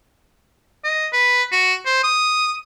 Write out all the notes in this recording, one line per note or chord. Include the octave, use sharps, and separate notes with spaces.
D#5
B4
F#4
C5
D#6